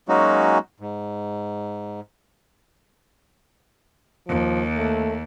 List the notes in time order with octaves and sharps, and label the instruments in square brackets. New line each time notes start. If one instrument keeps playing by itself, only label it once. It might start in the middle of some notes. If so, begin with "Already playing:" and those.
[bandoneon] F#3 G#3 A#3 C#4 D#4 F#4
G#2
[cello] D#2 [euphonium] F3
[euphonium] A3